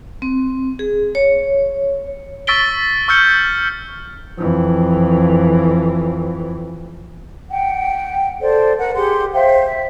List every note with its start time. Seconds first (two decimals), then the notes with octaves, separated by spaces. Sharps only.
0.22 C4
0.79 G#4
1.15 C#5
2.47 C#6 E6 A6 B6 D7 G7
3.08 C#6 E6 F6 G6 C#7 G7
4.38 F2 E3
7.50 F#5 G5
8.41 A4 C5 D5
8.77 A#4 F#5
8.94 G4 G#4 F#5 C6
9.32 C5 E5 F5 G5
9.65 E5